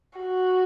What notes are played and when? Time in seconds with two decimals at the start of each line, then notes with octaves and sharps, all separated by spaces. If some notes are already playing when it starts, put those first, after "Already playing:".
0.19 F#4